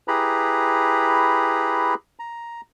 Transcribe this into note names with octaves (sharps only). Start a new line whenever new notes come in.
E4 G4 G#4 B4 A#5 B5
A#5